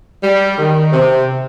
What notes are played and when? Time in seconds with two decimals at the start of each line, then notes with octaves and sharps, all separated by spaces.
0.23 G3
0.58 D#3
0.93 C3